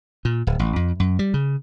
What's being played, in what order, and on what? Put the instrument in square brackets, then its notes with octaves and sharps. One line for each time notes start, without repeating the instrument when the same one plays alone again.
[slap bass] A#2
D1
A1
F2
F#2
G3
C#3